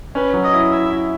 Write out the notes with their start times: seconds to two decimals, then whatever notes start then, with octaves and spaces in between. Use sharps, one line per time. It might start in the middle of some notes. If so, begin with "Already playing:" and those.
0.15 C#4 B4
0.33 F#3
0.44 D#5
0.53 E4
0.71 E4 E5
0.90 E4